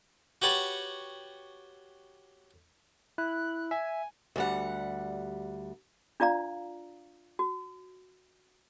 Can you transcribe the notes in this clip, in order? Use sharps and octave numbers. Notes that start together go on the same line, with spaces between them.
F#4 G4 B4 C#5 F#5 A5
E4 F#6
E5 G#5
D2 G3 F#5
D4 F4 D5 F5 A#5
F#4